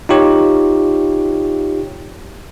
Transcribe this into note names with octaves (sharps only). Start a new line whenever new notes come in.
D#4 F4 G4 C#5